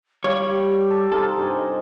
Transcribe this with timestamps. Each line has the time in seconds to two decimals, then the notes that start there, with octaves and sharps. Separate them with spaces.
0.24 G3 C#5 F5
0.44 G4
0.90 A4
1.12 C3 D#4 F4 A4
1.37 G2 C5 G#5
1.57 D#5